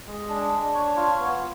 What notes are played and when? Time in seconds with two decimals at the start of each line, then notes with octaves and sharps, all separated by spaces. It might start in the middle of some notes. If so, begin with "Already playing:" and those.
0.07 G#3
0.29 D4
0.52 D4
0.74 C#5
0.96 F4
1.19 B3